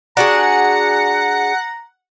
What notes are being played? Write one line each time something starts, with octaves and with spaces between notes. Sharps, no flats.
D4 F#4 G#4 F#5 A#5